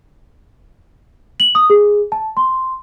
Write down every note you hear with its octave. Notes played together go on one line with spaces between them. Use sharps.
F#7
D#6
G#4
A5
C6